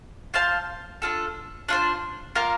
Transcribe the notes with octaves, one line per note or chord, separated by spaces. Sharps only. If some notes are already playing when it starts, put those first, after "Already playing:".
F4 C5 F5 A5
D4 F4 A4
D4 F4 C5
A#3 F4 A#4